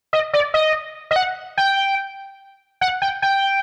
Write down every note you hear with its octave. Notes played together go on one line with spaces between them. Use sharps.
D#5
D5
D#5
D#5
F#5
G5
F#5
G5
G5